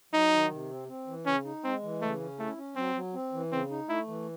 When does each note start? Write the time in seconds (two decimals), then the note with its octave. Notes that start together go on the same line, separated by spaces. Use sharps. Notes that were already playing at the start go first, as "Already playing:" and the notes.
0.13 F#3 D#4
0.33 D#3
0.51 C3
0.69 C4
0.88 C4
1.07 E3
1.26 C#3 C#4
1.45 D#4
1.64 G#3 C4
1.83 E3
2.02 C#3 A3
2.20 C#4
2.39 A3 E4
2.57 C#4
2.76 F#3 C4
2.95 F#3
3.14 C4
3.33 E3
3.52 C#3 C4
3.70 D#4
3.89 A3 E4
4.08 E3